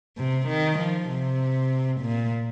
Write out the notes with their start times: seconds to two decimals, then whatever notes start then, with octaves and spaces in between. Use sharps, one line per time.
0.18 C3
0.48 D#3
0.79 F3
1.09 C3
2.02 A#2